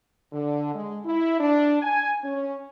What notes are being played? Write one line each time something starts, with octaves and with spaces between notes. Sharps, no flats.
D3
G#3
E4
D4
G#5
C#4